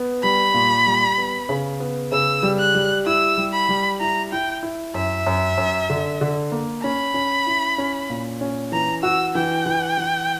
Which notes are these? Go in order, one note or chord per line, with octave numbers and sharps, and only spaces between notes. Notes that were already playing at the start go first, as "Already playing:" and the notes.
Already playing: B3
G3 B5
A#2
G3
B3
C#3
B3
C#3 E6
G3
F#6
G3
E4 E6
G3
B5
G3
E4 A#5
E4 G5
E4
F#2 E5
F#2
F#2
D3
D3
A#3
C#4 B5
C#4
E4
C#4
A#2
C#4
E3 A#5
F#4 E6
E3 G5
E3
E3